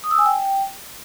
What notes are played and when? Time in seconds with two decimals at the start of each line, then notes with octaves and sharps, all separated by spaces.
0.04 D#6
0.11 E6
0.19 G#5
0.26 G5